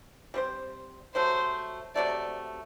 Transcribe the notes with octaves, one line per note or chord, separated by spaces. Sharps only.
G3 C4 G4 C5
C3 F#3 A3 C5
C3 F#3 A3 D5